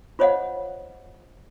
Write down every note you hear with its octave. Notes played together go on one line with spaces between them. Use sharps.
F4 C5 C#5 D#5 F5 F#5